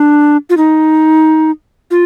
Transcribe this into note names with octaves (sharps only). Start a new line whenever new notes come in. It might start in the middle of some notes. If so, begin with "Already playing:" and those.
Already playing: D4
F4
D#4
F4